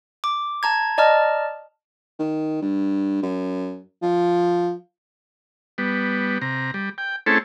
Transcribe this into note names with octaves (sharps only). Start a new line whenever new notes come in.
D6
A5 A#5 G#6
D5 D#5 A5 A#5 F6
D#3
G2
F#2
F3
G3 B3
C3 A#5
G3
G5
A3 C4 C#4 E4 G#4 A4